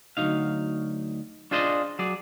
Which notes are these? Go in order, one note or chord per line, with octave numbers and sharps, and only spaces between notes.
D2 D#3 F#3 D#4 F5
D4 F4 G#4 C5 D5 D#5
F#3 G#4 D5